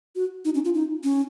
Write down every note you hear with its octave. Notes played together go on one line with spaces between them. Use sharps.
F#4
D#4
C#4
F4
D#4
C#4